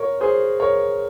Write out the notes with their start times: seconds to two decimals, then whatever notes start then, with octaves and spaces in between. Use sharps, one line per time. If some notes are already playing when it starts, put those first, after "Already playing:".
Already playing: A#4 C#5
0.20 G#4 C5
0.60 A#4 C#5